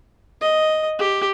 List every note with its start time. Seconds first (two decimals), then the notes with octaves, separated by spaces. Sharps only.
0.41 D#5
0.99 G4